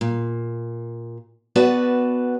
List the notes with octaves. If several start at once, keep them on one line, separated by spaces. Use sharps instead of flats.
A#2
B3 F#4 B4 D5 A5